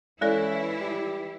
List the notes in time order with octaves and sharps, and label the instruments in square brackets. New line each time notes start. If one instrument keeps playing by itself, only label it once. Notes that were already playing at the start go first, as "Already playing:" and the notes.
[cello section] E3 E4 [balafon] G#3 A4 D5 [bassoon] C#4
[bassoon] G3